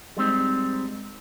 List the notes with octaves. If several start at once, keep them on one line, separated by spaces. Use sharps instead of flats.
G3 G#3 C4 D#4